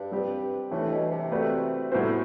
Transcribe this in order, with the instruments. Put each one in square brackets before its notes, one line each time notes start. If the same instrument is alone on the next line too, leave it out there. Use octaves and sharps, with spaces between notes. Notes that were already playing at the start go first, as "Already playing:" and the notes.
Already playing: [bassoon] G2
[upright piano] G3 C4 G4 B4 D5
[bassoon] A2 [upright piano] E3 A3 D4 A4
[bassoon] B2
C3
[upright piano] A3 C4 F#4 B4 D5
[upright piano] A2 G3 B3 F#4 C5 [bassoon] E3
[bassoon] D3